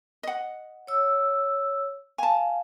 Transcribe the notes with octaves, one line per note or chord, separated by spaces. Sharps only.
D#5 F#5
C#5 E6
F5 G#5 A5